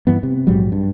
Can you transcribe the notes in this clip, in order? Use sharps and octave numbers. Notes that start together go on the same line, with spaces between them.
G2 E3 B3
C3
A#1 G#2 F#3 G3
G2